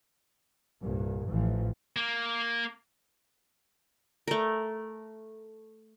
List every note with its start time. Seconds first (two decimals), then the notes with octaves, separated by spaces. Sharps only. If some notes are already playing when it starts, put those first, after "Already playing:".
0.81 C2 G2 A#2
1.30 A1 E3 F3
1.96 A#3
4.28 A3 A#4